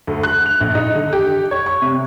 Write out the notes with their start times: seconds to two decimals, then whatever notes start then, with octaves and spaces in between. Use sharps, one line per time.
0.07 D2
0.23 F#6
0.46 F7
0.61 A#1
0.75 D#4
0.95 D3
1.13 G4
1.51 C#5
1.66 C#6
1.82 C3